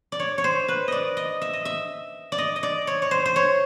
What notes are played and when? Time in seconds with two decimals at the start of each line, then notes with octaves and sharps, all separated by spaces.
0.12 D5
0.19 C#5
0.38 C#5
0.44 C5
0.68 B4
0.88 D5 D#5
1.17 D#5
1.41 E5
1.53 D#5
1.65 E5
2.32 D5
2.38 D#5
2.56 D#5
2.63 D5
2.87 C#5
3.02 C#5
3.11 C5
3.25 C5
3.36 C#5